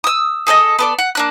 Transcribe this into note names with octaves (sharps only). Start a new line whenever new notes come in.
D#6 E6
G#4 A4 D5 D#5
B3 A4 D5
F#5
A#3 D4 F#6